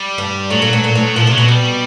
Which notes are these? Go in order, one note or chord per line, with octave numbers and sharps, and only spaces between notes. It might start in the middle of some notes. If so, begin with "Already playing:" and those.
Already playing: G3
G2
A2 F#3
A#2
A2
A#2
A2
A#2 F3
C3 F#3
B2
B2 G3